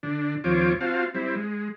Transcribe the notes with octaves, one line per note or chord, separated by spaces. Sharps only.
D3 D4
D#2 F3 C4 F4 C#5 D6
C4 F4 F#4 F5 A5
G3 C4 E4
G#3